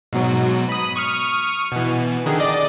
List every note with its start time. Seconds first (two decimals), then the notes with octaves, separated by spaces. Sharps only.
0.13 G#2 B2 F#3
0.69 B5 D#6
0.96 C#6 D#6 F6
1.72 B2 E3
2.26 D3 D#3 G#4
2.40 D5 D#5